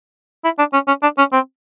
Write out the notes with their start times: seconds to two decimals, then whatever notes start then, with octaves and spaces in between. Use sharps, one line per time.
0.44 E4
0.59 D4
0.73 C#4
0.88 C#4
1.03 D4
1.18 C#4
1.33 C4